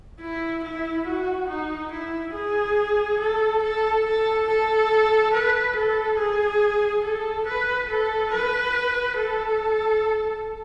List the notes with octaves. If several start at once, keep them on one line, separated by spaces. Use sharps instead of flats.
E4
E4
F#4
D#4
E4
G#4
A4
A4
A4
A4
B4
A4
G#4
A4
B4
A4
B4
A4